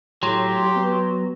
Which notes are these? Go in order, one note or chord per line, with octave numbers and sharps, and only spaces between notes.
A2 F#3 G4 C6
B3